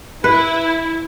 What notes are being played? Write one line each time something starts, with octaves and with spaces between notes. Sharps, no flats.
E4 B4